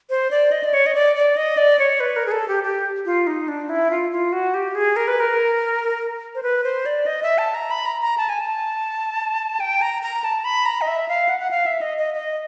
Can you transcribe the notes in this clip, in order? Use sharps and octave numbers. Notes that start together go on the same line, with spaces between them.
C5
D5
D#5
D5
C#5
D#5
D5
D5
D#5
D5
C#5
B4
A#4
G#4
A4
G4
G4
F4
D#4
D4
E4
F4
F4
F#4
G4
G#4
A#4
B4
A#4
C5
B4
C5
D5
D#5
E5
A5
A#5
B5
A#5
A#5
A5
G#5
A5
G5
A#5
A#5
A5
B5
A#5
D#5
E5
F5
F#5
F#5
F5
E5
D#5
D#5
D#5